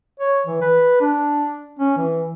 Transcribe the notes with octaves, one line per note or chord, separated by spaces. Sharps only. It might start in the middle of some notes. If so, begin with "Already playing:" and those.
C#5
E3
B4
D4
C#4
E3